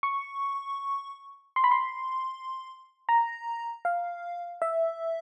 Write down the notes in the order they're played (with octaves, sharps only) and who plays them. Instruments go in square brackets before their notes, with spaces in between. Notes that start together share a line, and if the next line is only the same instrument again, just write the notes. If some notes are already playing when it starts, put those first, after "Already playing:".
[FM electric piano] C#6
C6
B5
C6
A#5
F5
E5